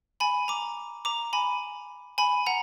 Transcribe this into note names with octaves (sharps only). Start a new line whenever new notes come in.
G#5 B5
A#5 D6
A#5 D6
G#5 B5
G#5 B5
F#5 A#5